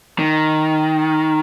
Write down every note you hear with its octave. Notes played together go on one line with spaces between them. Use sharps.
D#3